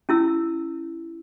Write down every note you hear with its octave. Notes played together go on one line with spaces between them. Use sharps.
C#4 E4 E6